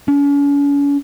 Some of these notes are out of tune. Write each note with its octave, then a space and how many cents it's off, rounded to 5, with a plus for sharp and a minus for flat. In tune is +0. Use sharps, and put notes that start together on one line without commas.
C#4 +40